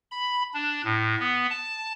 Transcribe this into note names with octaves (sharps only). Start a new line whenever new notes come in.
B5
D4
A2
B3
A5